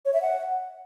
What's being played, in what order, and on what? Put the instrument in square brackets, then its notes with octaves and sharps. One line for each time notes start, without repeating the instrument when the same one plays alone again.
[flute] C#5
E5
F#5